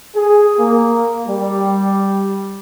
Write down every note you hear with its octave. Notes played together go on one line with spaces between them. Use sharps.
G#4
A#3
G3